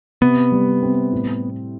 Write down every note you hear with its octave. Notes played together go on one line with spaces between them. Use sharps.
C3 B3
G3
C4
A2